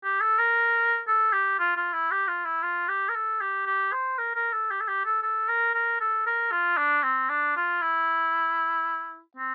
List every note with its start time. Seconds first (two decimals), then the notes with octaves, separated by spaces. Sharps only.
0.04 G4
0.21 A4
0.39 A#4
1.08 A4
1.33 G4
1.59 F4
1.77 F4
1.93 E4
2.11 G4
2.28 F4
2.45 E4
2.63 F4
2.88 G4
3.09 A#4
3.15 A4
3.41 G4
3.66 G4
3.93 C5
4.18 A#4
4.36 A#4
4.53 A4
4.71 G4
4.81 A4
4.88 G4
5.06 A4
5.22 A4
5.48 A#4
5.74 A#4
6.01 A4
6.27 A#4
6.52 F4
6.77 D4
7.03 C4
7.29 D4
7.56 F4
7.81 E4
9.37 C4